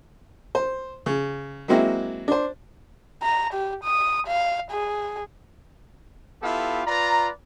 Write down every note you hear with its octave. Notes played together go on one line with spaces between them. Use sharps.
C5
C#3
F#3 G#3 A#3 C4 E4 F#4
D4 C5
A#5
G4
D#6
F5
G#4
B3 E4 F4 G4 A4 F5
F4 B4 D5 A#5